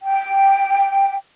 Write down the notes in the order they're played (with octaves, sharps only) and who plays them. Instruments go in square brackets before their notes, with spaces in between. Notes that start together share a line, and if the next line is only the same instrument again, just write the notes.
[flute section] G5